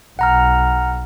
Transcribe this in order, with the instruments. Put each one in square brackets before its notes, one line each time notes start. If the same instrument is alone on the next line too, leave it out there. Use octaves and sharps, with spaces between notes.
[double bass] B1 [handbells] F#5 A#5 F6